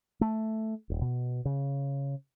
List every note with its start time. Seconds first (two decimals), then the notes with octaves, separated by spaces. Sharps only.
0.21 A3
0.90 D#1
1.01 B2
1.45 C#3